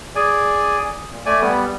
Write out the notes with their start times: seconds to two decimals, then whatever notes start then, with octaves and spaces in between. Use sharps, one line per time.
0.16 G#4 D5 G#5
1.11 A#2
1.26 A3 D5 G#5
1.41 G3 B3